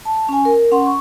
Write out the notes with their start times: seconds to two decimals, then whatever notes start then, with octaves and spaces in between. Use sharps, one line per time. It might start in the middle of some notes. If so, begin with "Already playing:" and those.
0.05 A5
0.29 C#4 G#5
0.45 A#4
0.71 C#4 F#5 C6
0.86 C#6